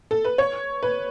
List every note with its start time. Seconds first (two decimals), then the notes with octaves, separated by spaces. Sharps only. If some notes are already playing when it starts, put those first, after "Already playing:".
0.11 A4
0.25 B4
0.38 C#5
0.83 B4